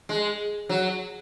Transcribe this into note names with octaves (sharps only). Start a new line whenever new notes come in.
G#3
F#3